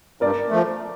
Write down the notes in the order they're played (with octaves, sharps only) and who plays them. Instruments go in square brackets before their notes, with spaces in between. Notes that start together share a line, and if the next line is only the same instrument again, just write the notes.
[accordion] G2 [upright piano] A#4 D5
[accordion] F3 A3